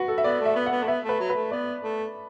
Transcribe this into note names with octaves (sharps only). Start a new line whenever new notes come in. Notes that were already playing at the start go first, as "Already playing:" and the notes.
Already playing: F#4 B4
A4
E5
B3 D5
A3
E5
B3
F#5
B3
A3
B3 E5
A3
B4
F#3
B4
A3
B3 D5
A3